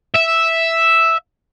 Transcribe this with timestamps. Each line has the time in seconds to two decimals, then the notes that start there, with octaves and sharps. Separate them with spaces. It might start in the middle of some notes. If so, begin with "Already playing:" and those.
0.16 E5